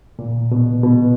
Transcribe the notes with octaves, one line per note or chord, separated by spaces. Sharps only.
A#2
B2
B2